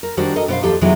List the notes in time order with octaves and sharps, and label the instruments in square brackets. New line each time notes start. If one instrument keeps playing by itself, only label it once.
[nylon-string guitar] A#4
D#3 G3 D4 F#4 C5
A4 A#4 D#5
B2 C5 F5
D#2 F3 G4 A4
C3 D#3 E3 F#3 G#3 B3